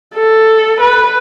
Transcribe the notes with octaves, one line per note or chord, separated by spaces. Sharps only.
A4
B4